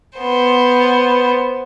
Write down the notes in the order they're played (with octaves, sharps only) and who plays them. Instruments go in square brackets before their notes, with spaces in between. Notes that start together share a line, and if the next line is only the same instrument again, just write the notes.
[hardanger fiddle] B3 C5